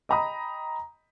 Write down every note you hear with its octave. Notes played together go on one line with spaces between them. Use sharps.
D#5 G5 A#5 B5 D#6